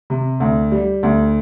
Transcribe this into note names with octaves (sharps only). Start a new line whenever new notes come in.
C3
D2
G3
D2